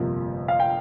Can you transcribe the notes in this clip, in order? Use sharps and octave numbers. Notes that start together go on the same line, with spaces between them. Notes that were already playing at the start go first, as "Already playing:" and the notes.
Already playing: G1 F2 C3 F3 A#3
F5
G5